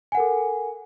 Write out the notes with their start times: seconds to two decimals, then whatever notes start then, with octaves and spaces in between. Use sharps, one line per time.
0.12 G#5
0.15 F#5
0.17 A#4
0.20 A4